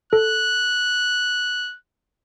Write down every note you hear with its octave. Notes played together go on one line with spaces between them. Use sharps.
A4 F#6